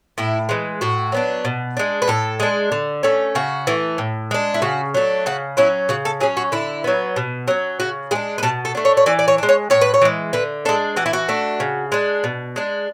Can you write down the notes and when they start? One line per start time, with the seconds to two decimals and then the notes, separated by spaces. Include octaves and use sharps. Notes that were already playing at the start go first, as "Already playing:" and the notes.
0.18 A2 E4
0.49 E3 G#3
0.81 A2 F#4
1.12 F#3 B3 D4
1.45 B2
1.77 G#3 D4
2.02 B4
2.08 A2 A4
2.40 G#3 D4
2.72 D3
3.03 A3 C#4
3.35 C#3 F#4
3.67 E3 A3
3.98 A2
4.31 G#3 D4
4.54 E4
4.62 C#3 F#4
4.94 F#3 A3 D4
5.26 C#3 F#4
5.57 F#3 C#4 E4
5.89 C#3 F#4
6.05 A4
6.20 F#3 C#4 G#4
6.37 F#4
6.52 D3 E4
6.84 F#3 B3
7.16 B2
7.48 F#3 C#4
7.80 C#3 F#4
8.11 G#3 D4 G#4
8.38 B4
8.43 B2 A4
8.65 A4
8.75 A3 D4
8.85 C#5
8.97 C#5
9.06 E3 D5
9.19 D5
9.28 C#5
9.38 G#3 D4
9.49 C#5
9.70 A2 C#5
9.81 B4
9.94 C#5
10.02 E3 G#3
10.33 D3 B4
10.65 G#3 D4 A4
10.96 E3 F#4
11.06 E4
11.13 F#4
11.29 A3 D4
11.60 C#3
11.92 G#3 D4
12.24 B2
12.56 G#3 D4